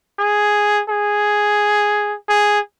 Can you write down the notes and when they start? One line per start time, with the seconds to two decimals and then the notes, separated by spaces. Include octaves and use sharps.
0.19 G#4
0.89 G#4
2.28 G#4